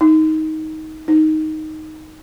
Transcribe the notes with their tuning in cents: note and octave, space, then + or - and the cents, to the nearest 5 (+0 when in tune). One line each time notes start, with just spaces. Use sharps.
D#4 +15
D#4 +5